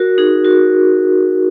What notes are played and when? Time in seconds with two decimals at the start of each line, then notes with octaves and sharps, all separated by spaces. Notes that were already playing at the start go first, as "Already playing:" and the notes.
Already playing: F#4 A#4
0.18 D#4 G#4
0.45 F#4 A#4